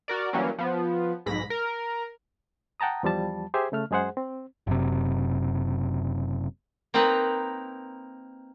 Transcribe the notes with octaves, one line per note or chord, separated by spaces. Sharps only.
F#4 A#4 D5
E3 F#3 G3 A#3 C#4
F3 B3
B1 G#2 B5 A#6 B6
A#4
F#5 G5 A5 A#5 D#6
E2 F3 G3 A5
G4 G#4 C5 E5 G#5
C#3 A3 F6
F#2 G#3 G#4 C5 F#5
C4
F#1 F#2 C3
A#3 C4 D#4 A#4 B4